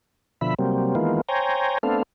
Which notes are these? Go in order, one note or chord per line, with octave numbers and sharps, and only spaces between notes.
B2 D3 F3 E5 B5
C3 F#3 G3 A#3 C4
D#3 E3 G#3 A#3 B3 F4
C5 C#5 G5 G#5 A#5
A3 B3 C4 D4 A4 F5